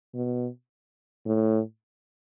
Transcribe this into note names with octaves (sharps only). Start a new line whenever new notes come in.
B2
A2